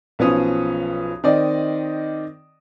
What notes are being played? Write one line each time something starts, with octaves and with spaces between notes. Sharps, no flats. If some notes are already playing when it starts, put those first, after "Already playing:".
B1 F3 B3 C#4 D#6
D#3 C4 D5 D#5